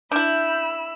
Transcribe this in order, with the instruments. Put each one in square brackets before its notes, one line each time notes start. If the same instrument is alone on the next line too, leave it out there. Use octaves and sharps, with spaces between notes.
[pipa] D4 E4 [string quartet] B5 E6 [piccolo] G6